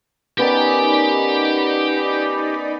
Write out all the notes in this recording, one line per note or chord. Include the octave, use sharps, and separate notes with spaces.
D#3 B3 C#4 D#4 G4 D5 G5 B5